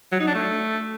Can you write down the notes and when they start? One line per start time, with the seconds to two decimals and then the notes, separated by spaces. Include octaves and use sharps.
0.12 F#3
0.20 D#4
0.27 D4
0.35 A3